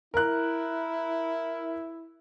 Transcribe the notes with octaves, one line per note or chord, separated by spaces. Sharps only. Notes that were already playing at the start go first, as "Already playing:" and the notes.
E4 A#4 F#6